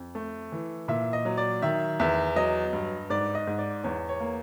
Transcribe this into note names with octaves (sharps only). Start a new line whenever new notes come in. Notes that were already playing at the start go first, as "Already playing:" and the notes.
Already playing: F2
A3
E3
A#2 E5
D#5
F#3
D5
D#3 E5
E2 E5
F#3 D#5
G2
G#2 D5
D#5
G#2
D5
E2 C#5
C#5
A#3